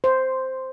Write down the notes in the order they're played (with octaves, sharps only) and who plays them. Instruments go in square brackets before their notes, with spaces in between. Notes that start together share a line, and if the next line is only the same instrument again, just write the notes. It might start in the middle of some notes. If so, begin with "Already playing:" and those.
[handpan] C5